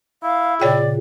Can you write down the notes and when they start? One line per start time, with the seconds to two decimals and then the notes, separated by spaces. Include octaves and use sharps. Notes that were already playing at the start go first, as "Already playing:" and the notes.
0.23 E4 F5
0.61 A#2 C#3 C#5 D5 G5